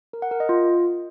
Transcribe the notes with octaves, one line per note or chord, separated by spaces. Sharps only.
A#4
F#5
A#4
D#5
F4